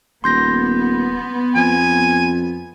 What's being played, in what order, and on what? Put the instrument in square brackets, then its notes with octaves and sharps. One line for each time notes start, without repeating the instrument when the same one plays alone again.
[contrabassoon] D#1 [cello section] B3 [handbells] C6 G6 A#6
[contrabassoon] F2 [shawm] G#5